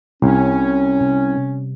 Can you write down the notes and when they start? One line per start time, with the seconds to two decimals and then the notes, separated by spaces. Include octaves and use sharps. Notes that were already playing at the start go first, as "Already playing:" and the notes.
0.22 C2 C3 G3 C#4
1.01 C3